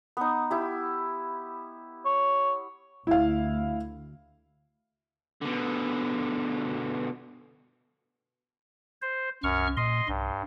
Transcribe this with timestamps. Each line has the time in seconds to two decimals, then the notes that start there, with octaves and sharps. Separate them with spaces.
0.17 B3 D#4
0.51 E4 G4
2.05 C#5
3.07 D2 E4 F5
5.41 B2 D3
9.02 C5
9.43 C2 F#2 C#6 F6
9.77 A#2 D#5 C6
10.08 B1 G2